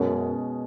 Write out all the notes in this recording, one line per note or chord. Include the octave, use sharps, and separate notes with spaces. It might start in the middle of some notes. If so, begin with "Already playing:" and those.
Already playing: F#2 B2 G#3 C#4